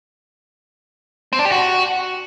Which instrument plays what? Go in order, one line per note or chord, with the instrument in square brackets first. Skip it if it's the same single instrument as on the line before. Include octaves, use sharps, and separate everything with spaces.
[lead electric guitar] C4
D4
G4
F#4